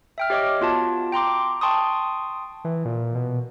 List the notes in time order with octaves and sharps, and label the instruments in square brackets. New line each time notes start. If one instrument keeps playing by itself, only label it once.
[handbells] E5 G5 F6
G4 C#5 D#5 D6
B3 F4 F#4 A5
G5 A#5 C6 D6
G5 A5 C6 C#6 D#6
[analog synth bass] E3
A#2
B2